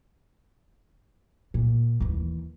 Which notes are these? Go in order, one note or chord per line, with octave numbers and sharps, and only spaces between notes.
A#2
D#2 E3